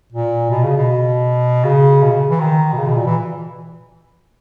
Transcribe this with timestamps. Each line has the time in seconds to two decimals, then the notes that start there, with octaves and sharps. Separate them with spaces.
0.13 A#2
0.51 B2
0.64 C#3
0.77 B2
1.64 C#3
2.02 B2
2.11 C#3
2.31 E3
2.40 D#3
2.73 B2
2.78 C#3
2.87 B2
2.97 A#2
3.06 E3